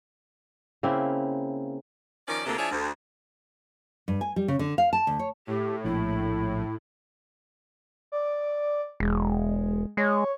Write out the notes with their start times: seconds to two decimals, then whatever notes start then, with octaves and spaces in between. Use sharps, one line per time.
0.83 C#3 A#3 C4 E4
2.28 D#3 F3 C#4 D5
2.45 D2 C3 G#3 A#3 A4
2.57 F3 D4 E4 G#4 C#5 E5
2.71 D2
4.08 G2
4.21 G#5
4.36 G3
4.48 C#3
4.59 D3
4.78 F5
4.93 A5
5.07 D2
5.19 C#5
5.47 A2 G4
5.84 A#1 E4
8.12 D5
9.00 E1 G#3
9.97 G#3 C#5